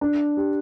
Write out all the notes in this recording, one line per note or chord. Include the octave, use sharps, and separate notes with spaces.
D4
G4